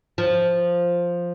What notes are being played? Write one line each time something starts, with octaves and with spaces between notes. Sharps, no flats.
F3